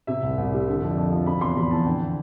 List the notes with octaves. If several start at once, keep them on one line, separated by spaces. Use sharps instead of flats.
C3 E5
C2
C2
G3
D3
F2
F2
F3
C3 B5
E2 C6
E2 B5
E3 A5
D3 G5